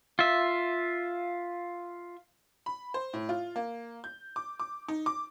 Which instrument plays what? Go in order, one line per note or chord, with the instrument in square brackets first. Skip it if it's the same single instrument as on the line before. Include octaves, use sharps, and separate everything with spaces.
[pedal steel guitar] F4 E5
[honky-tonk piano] B5
C5
A2
F4
A#3
G6
D6
D6
D#4
D6